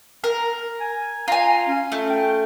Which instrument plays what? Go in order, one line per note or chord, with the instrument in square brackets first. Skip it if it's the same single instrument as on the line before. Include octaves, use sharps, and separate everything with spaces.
[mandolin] A#4
[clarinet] G#5
[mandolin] F4 G#5 [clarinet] A#5
[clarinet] C#4
[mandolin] A3
[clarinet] G5